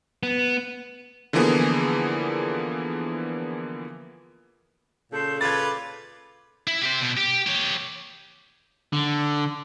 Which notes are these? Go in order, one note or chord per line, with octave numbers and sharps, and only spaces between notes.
B3
D3 E3 F3 A#3 B3 G#4
A#2 C#3 A4 A5 C6 G6
F4 B4 D6 G#6 A6
E4
G4 C5
B2
G4
G4 C#5
D3